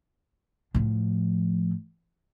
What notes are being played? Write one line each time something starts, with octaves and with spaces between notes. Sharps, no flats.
A2 F3